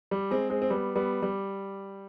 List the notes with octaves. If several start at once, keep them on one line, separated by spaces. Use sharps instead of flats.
G3
G#3 C4
G#3 C4
C4
G3 B3
G3 B3
G3